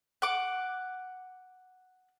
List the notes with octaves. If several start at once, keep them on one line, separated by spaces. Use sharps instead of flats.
F#5 D6